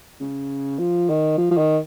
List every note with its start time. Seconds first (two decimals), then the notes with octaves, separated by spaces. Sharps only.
0.20 C#3
0.79 F3
1.09 D#3
1.38 F3
1.51 F3
1.58 D#3